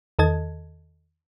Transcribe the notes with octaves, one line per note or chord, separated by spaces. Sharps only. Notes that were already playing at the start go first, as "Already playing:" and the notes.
E2 D#3 A4 D#5 A5 G#6